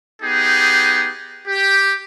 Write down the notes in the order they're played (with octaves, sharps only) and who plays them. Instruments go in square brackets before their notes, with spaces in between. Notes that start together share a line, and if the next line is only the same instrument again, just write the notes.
[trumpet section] B3 D#4 G4 G#4
G4